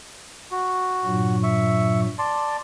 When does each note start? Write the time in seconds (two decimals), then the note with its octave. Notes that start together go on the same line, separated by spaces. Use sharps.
0.51 F#4
1.05 G2 A#2 F#3
1.43 E5 C#6
2.19 D5 A5 C6